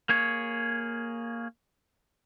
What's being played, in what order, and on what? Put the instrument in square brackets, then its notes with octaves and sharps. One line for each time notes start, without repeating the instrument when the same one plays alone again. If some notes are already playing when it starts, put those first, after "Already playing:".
[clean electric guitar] A#3 G#4 C#5